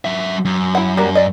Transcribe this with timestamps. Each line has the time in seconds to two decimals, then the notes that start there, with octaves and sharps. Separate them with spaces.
0.05 F#3 E5
0.45 F#2
0.75 E4 F#5
0.97 F#3 G3 A#3
1.15 D5 D#5